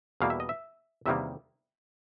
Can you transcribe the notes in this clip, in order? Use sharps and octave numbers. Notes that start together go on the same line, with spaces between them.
E2 B2 G3 A#3 F5
E5
D#5
E5
E2 C3 D#3 G3 A#3 E5